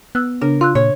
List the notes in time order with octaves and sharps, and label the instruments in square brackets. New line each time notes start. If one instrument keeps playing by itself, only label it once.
[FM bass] B3 [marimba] E6 F#6
[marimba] C#3 D4 [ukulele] A#4
[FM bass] F4 [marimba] C6 E6 F#6
[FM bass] A#2 [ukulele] C#5